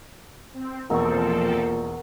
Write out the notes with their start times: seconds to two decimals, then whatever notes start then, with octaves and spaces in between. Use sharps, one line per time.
0.54 C4
0.90 E1 A#2 F3 C4 A4 A#4 F#5 C#6